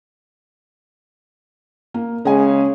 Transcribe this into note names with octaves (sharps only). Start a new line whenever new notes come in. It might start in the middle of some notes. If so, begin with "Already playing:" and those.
A#3
C#3 G#3 G#5